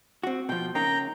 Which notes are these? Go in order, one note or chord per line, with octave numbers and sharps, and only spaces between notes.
C4 F#4
B2 F3 G5
C#3 A#3 D#4 G5 A#5